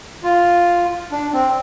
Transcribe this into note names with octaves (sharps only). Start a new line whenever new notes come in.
F4
D4
C4